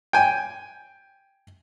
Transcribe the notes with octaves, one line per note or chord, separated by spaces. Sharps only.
G5 G#5